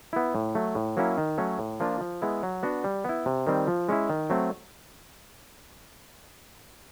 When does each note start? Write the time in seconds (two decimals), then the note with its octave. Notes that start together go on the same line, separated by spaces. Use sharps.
0.13 B3 E4
0.35 A2
0.55 F#3 A3
0.75 A2
0.97 F#3 A#3 C#4 E4
1.18 D#3
1.38 F#3 A3 C#4
1.59 A2
1.80 F3 A#3 D4 F4
2.01 F3
2.22 G#3 B3 E4
2.43 F#3
2.63 B3 D4 F#4
2.84 G3
3.05 B3 E4
3.26 C3
3.47 D#3 G3 C4
3.68 F3
3.89 G#3 C#4 E4
4.10 D#3
4.30 F#3 A3 C4